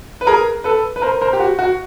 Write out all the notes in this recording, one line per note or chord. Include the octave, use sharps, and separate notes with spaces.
B4
G#4 A#4
A4 B4
B4
A#4 C5
A#4 C5
G4
F#4
F#4